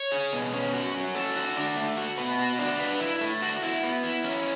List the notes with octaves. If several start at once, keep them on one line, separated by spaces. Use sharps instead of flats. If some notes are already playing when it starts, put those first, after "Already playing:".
Already playing: C#5
G#4
B2
C#4
F#4
C#4
A4
F#4
D4
A3
F#4
B3
F#4
D4
B4
E4
A3
F#4
E4
B3
E4
C#4